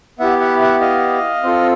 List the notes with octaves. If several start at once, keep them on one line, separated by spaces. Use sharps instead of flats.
B3 E4 G4 E5 F#5
E5 F#5
E5 F#5
D#5 F5
C4 F4 A4